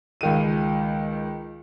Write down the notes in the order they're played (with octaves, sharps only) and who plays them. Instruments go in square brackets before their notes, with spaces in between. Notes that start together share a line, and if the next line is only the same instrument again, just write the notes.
[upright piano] C#2 D#3 D#7